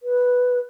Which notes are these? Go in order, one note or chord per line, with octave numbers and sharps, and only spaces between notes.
B4